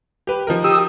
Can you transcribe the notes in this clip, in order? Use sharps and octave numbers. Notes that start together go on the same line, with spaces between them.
G4 B4
F3 D#4 A#4
G4 D#6 E6